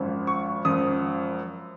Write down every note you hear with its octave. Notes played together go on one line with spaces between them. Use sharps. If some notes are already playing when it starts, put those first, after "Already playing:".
Already playing: G#1 F#2 F3
C#6
G#1 F#2 F3 D#6